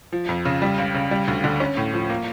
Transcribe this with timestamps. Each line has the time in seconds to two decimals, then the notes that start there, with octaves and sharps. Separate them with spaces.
0.12 F3
0.29 F2
0.45 C#3
0.62 G3
0.78 C#2
0.95 C#3
1.11 G3
1.28 D2
1.44 D3
1.60 C#4
1.77 A2
1.94 F3
2.10 A#3